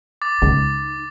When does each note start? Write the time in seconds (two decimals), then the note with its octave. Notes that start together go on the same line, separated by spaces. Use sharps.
0.22 D6 A6
0.42 C#2 D#4